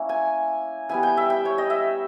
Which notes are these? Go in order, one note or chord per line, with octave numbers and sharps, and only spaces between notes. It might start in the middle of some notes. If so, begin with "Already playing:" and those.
Already playing: A#3 C#4 E4
G#5
G3 B3 E4 G#5
G5
E5
G5
C#5
D#5
E5